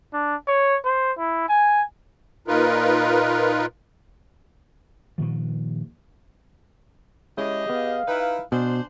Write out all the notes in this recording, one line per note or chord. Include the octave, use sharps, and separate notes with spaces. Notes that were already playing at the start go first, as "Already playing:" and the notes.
D4
C#5
C5
E4
G#5
A#2 D#4 F4 A#4 B4
G2 A#2 D#3 F3
G#3 C#4 E4 G4 G#4 D#5
B3 F5
D#4 E4 B4 D#5 G5
B2 D4 C5 G#5